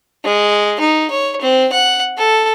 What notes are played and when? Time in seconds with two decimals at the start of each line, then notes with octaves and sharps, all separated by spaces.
0.25 G#3
0.80 D#4
1.11 C#5
1.42 C4
1.73 F#5
2.18 A4